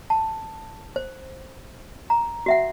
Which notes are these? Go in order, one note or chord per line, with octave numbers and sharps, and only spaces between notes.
A5
C5
A#5
F#4 E5 F#5